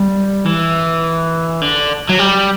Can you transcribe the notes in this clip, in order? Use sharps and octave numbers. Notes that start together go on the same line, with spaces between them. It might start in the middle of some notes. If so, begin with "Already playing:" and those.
Already playing: G3
E3
D3
F#3
G3